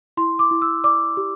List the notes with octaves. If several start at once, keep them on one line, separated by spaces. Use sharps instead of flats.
E4 C6
D6
E4
E6
D5 D6
G4